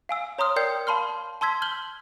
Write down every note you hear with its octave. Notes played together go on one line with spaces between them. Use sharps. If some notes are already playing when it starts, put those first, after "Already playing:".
F5 G#5 E6
C#5 A#5 C6 D#6 F6
A#4 D5 G5 D#6 G6 C7
F5 A5 B5 C6 F6
A5 C6 E6 G#6 B6
F6 G6 F#7 G7